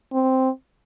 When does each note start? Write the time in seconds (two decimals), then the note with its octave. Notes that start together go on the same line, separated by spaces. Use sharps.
0.13 C4